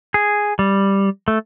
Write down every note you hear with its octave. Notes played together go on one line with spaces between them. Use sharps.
G#4
G3
A3